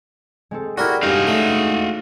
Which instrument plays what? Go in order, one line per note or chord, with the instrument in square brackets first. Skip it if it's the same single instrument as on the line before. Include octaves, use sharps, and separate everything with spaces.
[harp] G#3 C4 A4
[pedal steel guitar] E4 F#4 [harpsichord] G4 A#4 [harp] D5 B5
[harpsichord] G2 [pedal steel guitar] G#3 D#4 [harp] A#3 C#4 [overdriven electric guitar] F#4 F5
[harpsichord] A3